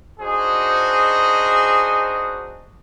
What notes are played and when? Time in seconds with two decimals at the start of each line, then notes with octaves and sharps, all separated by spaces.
0.20 D4 D#4 F#4 G#4 C5 D#5